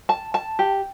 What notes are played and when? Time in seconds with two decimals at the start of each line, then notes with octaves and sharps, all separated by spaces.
0.09 A5
0.34 A5
0.59 G4